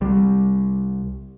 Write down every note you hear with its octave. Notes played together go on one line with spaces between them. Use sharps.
C2 G3